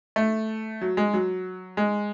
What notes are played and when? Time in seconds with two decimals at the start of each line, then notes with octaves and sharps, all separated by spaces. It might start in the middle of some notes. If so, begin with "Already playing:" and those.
0.16 A3
0.81 F#3
0.97 G#3
1.14 F#3
1.77 G#3